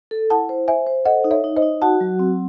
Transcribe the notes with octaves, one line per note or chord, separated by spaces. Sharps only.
A4
E4 F#5 A5
C5
C5 E5 G#5
C5
A4 D#5 F#5
D#4
C#5 E5
D#4
C5 D#5
D#4
F#4 F#5 A5
F#3
C4